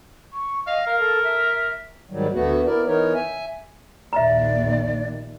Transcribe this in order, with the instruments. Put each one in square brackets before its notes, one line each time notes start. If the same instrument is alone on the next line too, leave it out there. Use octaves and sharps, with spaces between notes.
[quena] C#6
[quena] D#5 [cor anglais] F5
[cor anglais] A#4 [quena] F5
[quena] A4
E5
[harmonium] G#2 D#3 F#3 G3
D2 A3 B3 F#4
B3 E4 A#4 D5
E3 B3 D#4 A#4 C#5
E5 G#5
[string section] A#1 D#2 [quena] D5 [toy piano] E5 A#5